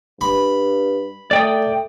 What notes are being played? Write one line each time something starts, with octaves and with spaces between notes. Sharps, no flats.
G2 B5
A3 D5 G5 D#6